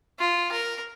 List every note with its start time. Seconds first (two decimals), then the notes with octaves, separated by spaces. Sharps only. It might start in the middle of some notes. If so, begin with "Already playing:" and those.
0.19 F4
0.52 A#4